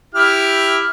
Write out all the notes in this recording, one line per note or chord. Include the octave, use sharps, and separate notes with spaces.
E4 G4 F6